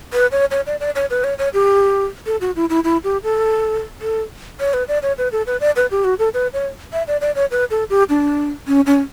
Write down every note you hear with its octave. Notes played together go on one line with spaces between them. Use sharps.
B4
C#5
C#5
D5
D5
C#5
B4
C#5
C#5
G4
A4
F#4
E4
E4
E4
G4
A4
A4
C#5
B4
D5
C#5
B4
A4
B4
D5
B4
G4
F#4
A4
B4
C#5
E5
D5
D5
C#5
B4
A4
G4
D4
C#4
C#4